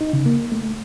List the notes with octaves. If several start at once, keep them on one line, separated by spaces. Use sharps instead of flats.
D#4
C#3
A#3
A3